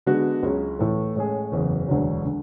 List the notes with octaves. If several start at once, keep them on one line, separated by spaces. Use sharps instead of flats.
D3 G#3 B3 F#4
C#2 C#3 F#3 C#4
A2 E3 A3
A2 G#3 C#4 G#4
F#1 E2 C#3
E1 D2 D3 F#3
D3